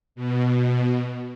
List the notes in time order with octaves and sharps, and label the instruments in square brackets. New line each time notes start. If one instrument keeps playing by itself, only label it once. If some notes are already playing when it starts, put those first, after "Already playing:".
[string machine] B2